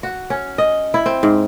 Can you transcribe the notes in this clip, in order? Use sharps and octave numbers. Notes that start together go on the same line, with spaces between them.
F#4
C#4
D#5
E4
C4
G#2